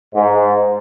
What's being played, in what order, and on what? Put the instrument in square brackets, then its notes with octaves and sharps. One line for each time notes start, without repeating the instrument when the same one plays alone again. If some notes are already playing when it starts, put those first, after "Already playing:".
[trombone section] G#2